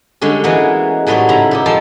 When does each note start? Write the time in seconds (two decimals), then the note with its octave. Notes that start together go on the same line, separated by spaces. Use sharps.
0.21 D3 G3 G#3 C#4
0.44 E3 G#3 A#3 B3 F#4 G#4
1.07 A2 F#3 G3 B3 D#4 F#4
1.29 G#2 C#3 E4 A#5
1.51 A#2 D#4 G4
1.66 F3 G#3 A4 A5 C6